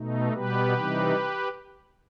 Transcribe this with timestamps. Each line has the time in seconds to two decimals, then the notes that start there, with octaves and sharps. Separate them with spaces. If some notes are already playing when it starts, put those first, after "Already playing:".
Already playing: B2 A3 D#4
0.32 B2 G3 B3 G4 B4
0.74 C3 E3 G3 D#4